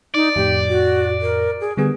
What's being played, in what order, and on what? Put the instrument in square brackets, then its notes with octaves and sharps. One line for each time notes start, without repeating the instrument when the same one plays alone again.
[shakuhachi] D#4 [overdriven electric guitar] D5
[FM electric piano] F2 A2 [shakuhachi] G4
[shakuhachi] F#4
A#4
G#4
[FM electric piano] D3 G3 B3 [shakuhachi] G#4